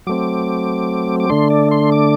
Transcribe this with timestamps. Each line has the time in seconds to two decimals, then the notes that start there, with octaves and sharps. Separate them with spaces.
0.07 F#3 A3 C4 D6
1.20 D6
1.30 D3 A3 D4 C6
1.50 D5
1.71 C6
1.92 D6